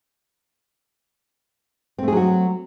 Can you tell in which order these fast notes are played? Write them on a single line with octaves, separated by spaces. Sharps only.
C4 A3 G#4 F#3 F#4